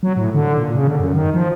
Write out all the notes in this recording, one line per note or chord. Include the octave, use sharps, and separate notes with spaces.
F#3
A2
D3
A#2
C#3
D3
F#2
D#3
F3